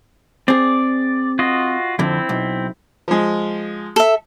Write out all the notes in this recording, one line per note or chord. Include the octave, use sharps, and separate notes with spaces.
C4 G#4 D5
F4 F#4 D#5
F2 D3 C4 E4
B1
F3 G#3
A4 E5